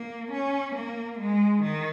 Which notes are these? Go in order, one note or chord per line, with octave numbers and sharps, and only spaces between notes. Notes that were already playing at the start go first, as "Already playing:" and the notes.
Already playing: A#3
C#4
A#3
G#3
D#3